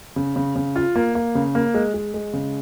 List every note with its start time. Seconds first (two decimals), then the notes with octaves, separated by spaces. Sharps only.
0.16 C#3
0.36 C#3
0.56 C#3
0.76 F4
0.96 A#3
1.15 A#3
1.35 C#3
1.55 A#3
1.74 G#3
1.94 G#3
2.14 G#3
2.33 C#3